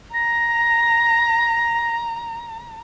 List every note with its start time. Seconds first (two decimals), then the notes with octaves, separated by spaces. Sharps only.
0.13 A#5 A#6